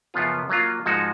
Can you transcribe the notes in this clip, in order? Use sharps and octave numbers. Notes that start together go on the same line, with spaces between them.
F#2 C#3 F3 B3 F4
F#3 A#3 F4
G#2 F3 G#3 D#4 F#4